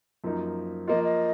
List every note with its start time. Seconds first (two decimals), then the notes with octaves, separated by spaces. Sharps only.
0.24 F#2 F3 A#3 D#4
0.88 F3 A#3 F4 D#5
1.04 D#5